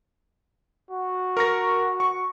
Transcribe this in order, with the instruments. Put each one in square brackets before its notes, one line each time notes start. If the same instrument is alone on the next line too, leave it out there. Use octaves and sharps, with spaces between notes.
[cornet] F#4
[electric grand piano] A#4 C#6 A#6
C#6